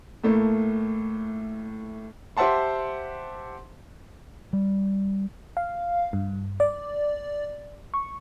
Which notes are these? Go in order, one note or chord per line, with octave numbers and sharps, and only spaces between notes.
A2 A3 A#3
G4 C5 E5 F#5 A5 C6
G3
F5
G2
D5
C#6